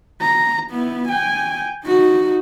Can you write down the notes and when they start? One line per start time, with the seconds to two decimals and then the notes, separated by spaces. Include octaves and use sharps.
0.22 A#5
0.71 B3 E4
1.08 G5 G#5
1.85 D#4 F#4